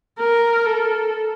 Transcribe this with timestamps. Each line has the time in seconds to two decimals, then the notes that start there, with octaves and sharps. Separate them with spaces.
0.19 A#4
0.65 A4